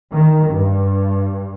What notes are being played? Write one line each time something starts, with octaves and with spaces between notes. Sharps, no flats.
D#3
G2